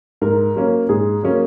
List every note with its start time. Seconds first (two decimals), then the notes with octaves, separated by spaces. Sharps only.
0.22 G#2 A#4
0.55 F#3 A#3 C#4
0.89 G#2 G#4
1.23 F#3 A#3 C#4